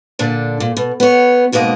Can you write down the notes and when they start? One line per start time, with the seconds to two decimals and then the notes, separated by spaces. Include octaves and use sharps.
0.19 A#2 D3 D4
0.60 A#2
0.77 B2
1.00 B3 C#5
1.52 F2 G#2 B2 A#3 D#5